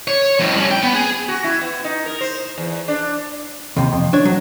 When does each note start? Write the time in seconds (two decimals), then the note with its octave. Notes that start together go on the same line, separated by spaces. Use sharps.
0.08 C#5
0.40 F2 A2
0.56 G3 C#4
0.71 G5
0.83 B3
0.95 G#4
1.28 F#4
1.44 E4
1.61 B3
1.84 D#4
2.06 A#4
2.21 C5
2.58 E2
2.88 D4
3.77 D#2 C3
3.93 F2
4.13 D4 C#5
4.25 F#3